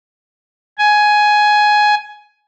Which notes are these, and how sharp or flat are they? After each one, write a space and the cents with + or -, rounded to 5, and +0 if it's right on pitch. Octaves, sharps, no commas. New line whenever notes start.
G#5 +10